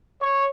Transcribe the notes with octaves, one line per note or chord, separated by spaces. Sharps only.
C#5